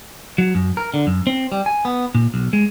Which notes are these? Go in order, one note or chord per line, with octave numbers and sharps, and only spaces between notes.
F#3
F#2
A#4
D3
F#2
C4
G3
G#5
B3
A#2
B1
G#3